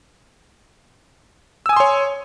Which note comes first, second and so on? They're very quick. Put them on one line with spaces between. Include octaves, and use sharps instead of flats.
E6 G#5 D#6 C6 C#5